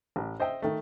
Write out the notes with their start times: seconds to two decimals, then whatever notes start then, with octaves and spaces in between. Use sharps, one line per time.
0.16 A1
0.40 C5 D#5 E5 G5
0.62 D#3 A3